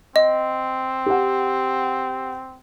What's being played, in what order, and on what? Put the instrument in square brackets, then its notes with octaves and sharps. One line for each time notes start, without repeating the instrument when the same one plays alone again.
[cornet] C4 [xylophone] D#5
[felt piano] G4 F#5